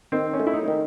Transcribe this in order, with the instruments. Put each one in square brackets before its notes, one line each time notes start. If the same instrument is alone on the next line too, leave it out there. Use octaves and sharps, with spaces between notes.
[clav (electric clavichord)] D#3 [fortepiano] C4
[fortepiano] C#4
[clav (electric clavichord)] A3
[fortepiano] E4
D#4
[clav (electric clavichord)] D#3